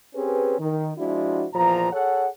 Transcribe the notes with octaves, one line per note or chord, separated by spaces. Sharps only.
C4 C#4 G4 G#4 B4
D#3
F3 G#3 D4 E4 F#4
E2 A#2 F3 A#5
G#4 A4 C#5 F#5